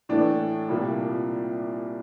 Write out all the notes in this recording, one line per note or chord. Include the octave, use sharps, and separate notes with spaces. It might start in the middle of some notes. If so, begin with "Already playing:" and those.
A2 E3 A3 D4
C2 A#2 G3 A#3